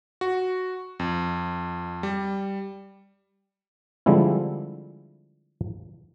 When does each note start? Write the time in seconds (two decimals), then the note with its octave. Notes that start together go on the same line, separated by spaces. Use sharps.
0.21 F#4
0.99 F2
2.03 G3
4.06 D3 F3 G3 G#3 C4 E4